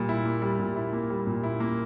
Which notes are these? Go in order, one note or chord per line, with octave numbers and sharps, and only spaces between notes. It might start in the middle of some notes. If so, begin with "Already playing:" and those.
Already playing: A#2 G3
E4
A#3
G3
A#2
E4
A#3
G3
A#2
E4
A#3